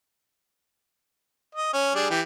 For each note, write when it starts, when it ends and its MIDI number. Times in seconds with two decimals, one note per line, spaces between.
1.55 1.73 75
1.73 1.95 61
1.95 2.07 55
1.95 2.07 62
1.95 2.07 68
2.11 2.21 52
2.11 2.21 67